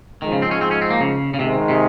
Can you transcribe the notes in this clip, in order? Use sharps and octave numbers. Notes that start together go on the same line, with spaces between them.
G#2 D#3 F3 G#3
C#3
C4
C#4
C4
C#4
C4
A#3
C#3
C#3
G#2 C3 D#3 G#3
C3